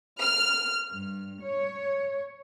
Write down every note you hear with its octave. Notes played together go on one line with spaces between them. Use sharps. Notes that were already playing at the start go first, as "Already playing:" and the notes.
F6
G2
C#5